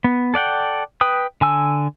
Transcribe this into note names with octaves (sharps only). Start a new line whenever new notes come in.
B3
A4 D5 F#5 G5
B4 G5 D#6
D3 G#5 E6